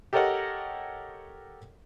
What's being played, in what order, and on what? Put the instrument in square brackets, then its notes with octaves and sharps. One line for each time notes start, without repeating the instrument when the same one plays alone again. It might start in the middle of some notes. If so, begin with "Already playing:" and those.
[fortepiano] G4 A4 A#4 C#5 D#5 F#5